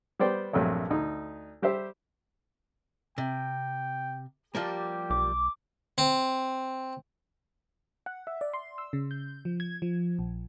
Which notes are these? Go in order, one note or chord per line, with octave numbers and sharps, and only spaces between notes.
G3 B3 C5 D5 G5
A#1 G2 C3 F#3 A3
D2 D#4
G3 G4 C5 E5
C3 G5
F3 G3 A#3 G4
B1 D6
C4
F#5
E5
D5
C6
E6
C#3
G6
F3
G#6
F3
A#1